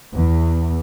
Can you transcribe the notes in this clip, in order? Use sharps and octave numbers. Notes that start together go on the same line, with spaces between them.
E2